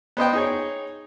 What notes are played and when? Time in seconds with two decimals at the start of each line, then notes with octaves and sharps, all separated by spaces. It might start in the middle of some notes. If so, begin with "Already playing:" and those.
0.17 B3 C5 D#5 G5
0.33 D#4 G#4 C#5